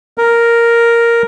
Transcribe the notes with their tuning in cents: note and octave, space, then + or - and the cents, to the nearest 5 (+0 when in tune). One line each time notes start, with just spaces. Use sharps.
A#4 +0